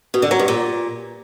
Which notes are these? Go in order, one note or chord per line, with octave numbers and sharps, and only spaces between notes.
B2
D3
F#3
G2
A#2